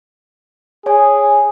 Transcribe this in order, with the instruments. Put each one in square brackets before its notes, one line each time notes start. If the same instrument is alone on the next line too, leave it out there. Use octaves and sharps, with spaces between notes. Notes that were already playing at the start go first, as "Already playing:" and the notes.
[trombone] G#4 [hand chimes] C#5 G#5